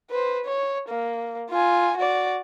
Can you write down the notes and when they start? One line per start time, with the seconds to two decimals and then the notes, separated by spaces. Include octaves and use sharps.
0.10 B4 C5
0.45 C#5
0.89 A#3
1.50 F4 G#5
1.96 F#4 D5